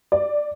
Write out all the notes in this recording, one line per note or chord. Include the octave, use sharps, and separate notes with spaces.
D5